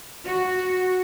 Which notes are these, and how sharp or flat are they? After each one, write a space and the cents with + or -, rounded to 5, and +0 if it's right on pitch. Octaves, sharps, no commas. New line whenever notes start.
F#4 -5